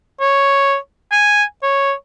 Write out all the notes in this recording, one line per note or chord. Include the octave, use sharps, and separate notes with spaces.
C#5
G#5
C#5